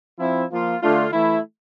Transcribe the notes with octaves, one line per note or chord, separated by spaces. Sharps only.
F3 C4 E4
F3 A#3 F4
D3 A3 D4 F4
E3 A3 E4